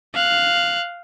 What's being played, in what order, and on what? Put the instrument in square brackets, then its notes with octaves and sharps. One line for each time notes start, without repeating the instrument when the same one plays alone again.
[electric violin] F5 F#6